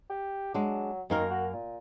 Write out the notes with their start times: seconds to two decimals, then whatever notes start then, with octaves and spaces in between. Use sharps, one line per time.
0.10 G4
0.54 F#3 G#3 D4
1.10 F#2 D#3 A#3 A#4
1.30 F#4
1.53 A#2